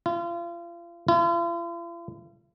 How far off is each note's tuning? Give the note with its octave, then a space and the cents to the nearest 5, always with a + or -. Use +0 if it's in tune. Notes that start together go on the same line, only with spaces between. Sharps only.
F4 -35
F4 -45